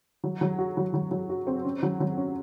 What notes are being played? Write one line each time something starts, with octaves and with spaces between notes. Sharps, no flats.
F#3
F#3
F#4
F#3
F#3
F#3
F#4
C4
C#4
F#3
F#3
C#4